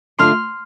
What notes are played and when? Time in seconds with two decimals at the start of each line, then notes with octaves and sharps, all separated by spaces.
0.19 D3 A3 D4 F4 C6 F6